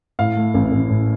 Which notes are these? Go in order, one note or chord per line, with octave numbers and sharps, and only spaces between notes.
A2 F5
A3
A1
A1
A2